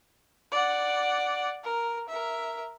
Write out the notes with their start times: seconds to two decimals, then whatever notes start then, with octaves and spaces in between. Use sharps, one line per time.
0.52 D5 F#5
1.64 A#4
2.08 A#4 E5